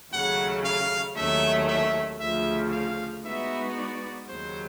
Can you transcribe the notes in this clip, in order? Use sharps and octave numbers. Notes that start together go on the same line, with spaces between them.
D#2 C#3 F#3 A3 F#5
F5
D#2 D#3 F#3 A3 C#4 E5
E5
D2 C#3 F3 E5
F5
G#3 B3 D#4 F#4 B4 E5
D5
D#2 C#3 F#3 C5